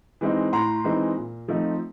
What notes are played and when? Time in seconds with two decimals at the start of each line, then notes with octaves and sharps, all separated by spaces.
0.21 E3 G#3 C4 D#4
0.52 A2 A#5 C6
0.84 E3 G#3 C4 D#4
1.16 A#2
1.48 F3 A3 C4 D#4